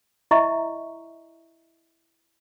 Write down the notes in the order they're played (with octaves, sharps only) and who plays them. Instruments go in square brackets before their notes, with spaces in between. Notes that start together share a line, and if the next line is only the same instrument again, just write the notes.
[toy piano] E4 D#5 E5 A#5 C#6